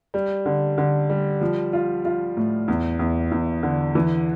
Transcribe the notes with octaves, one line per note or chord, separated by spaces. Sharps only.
G3
D3
D3
G3
F3
F4
F4
A2
E2
E2
E2
D3
E3